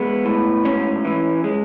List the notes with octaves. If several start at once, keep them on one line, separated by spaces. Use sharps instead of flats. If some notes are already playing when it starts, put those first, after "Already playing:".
Already playing: G#3 B3
A2
G#2 C#4
E3
G#3